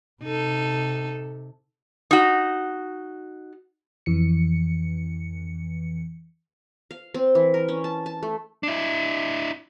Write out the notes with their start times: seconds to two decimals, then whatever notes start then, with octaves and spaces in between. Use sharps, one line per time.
0.23 C3 D#4 A4
2.11 D#4 F#4
4.06 F2 E3 C#7
6.91 F5
7.14 C4
7.35 E3
7.54 A#4
7.68 C#4
7.84 A5
8.06 A5
8.23 A3
8.63 D4 E4